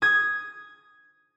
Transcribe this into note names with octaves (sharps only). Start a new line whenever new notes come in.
D#6 G#6